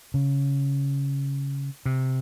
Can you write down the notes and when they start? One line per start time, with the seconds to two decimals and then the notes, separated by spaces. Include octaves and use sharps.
0.14 C#3
1.86 C3